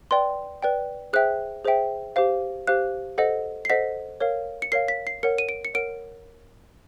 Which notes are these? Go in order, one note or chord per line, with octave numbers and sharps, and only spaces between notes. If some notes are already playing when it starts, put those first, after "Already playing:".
B4 D5 G5 C6
B4 D5 G5
G#4 C5 E5 G5 F#6
G#4 C5 E5 G5
G4 C5 F5
G4 C5 F5 F#6
A4 C5 D#5 F#5
C7
A4 C5 D#5 F#5 B6
A#4 C#5 F5
C#7
A#4 C#5 F5 C7
B6
C7
A#4 C#5 F#5 C#7
D#7
D7
C#7
A#4 C#5 F#5 D7